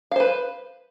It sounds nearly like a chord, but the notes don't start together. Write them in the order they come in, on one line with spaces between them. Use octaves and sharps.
F5 C5 B4